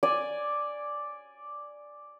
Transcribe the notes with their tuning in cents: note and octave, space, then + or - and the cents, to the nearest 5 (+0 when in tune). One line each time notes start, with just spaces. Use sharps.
D5 +0 G#5 +0